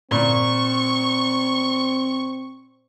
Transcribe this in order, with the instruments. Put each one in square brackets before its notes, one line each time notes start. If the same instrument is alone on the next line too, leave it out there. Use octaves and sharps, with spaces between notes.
[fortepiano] A#2 [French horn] C4 [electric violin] C#6